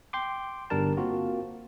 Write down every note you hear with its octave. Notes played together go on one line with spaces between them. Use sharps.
G5 C6 D6
G1 G3 D4 A#4 A5
A#3 C4 F4 F#4